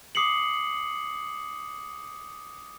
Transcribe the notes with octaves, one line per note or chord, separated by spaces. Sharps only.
D6 D#6 C7 C#7 F#7